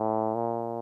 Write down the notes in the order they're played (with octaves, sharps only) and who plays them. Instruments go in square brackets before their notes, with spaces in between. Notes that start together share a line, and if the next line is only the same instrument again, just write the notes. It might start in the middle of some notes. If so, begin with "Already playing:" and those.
Already playing: [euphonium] A2
A#2